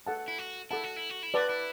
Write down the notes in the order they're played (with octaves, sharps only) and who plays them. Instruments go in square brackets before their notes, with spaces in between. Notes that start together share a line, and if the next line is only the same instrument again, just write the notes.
[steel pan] A4 F#5 A5
[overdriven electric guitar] E4
F#4
[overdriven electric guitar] E4 [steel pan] A4 F#5 A5
[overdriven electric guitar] F#4
E4
F#4
E4
[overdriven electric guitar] F#4 [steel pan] B4 D5 F#5 A5
[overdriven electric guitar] E4